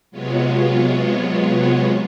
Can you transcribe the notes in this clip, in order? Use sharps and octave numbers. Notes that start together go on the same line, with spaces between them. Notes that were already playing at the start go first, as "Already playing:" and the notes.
C3 F#3 G#3 B3 F4 C#5